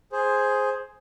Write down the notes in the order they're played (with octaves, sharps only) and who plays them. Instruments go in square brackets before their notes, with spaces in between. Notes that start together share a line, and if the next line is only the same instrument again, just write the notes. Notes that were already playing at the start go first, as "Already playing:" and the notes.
[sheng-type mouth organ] G#4 C5